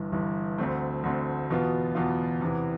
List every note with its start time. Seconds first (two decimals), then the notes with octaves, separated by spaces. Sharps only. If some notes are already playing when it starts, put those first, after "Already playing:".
Already playing: G1 G2 E3
0.12 G1 G2 E3
0.58 D2 D3 A3 C4
1.03 D2 D3 A3 C4
1.50 E2 B2 B3 F4
1.95 E2 B2 B3 F4
2.41 E2 C3 E3 B3 E4